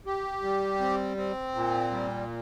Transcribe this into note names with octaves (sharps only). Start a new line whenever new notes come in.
G4
G3
C4
C4
A#2
G3